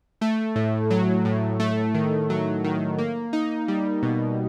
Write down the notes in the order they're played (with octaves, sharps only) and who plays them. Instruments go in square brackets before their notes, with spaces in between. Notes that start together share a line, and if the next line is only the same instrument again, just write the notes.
[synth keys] A3
A2
F#3
A2
A3
D#3
F#3
D#3
A#3
D#4
G3
B2